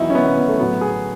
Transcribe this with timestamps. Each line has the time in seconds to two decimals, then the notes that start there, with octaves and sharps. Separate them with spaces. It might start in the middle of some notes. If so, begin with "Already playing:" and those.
Already playing: E2 D#3 F#3 D#4 E4
0.10 C#4
0.15 B3
0.26 B3
0.37 B3
0.48 A3
0.59 A2 F#3 B3
0.81 G#4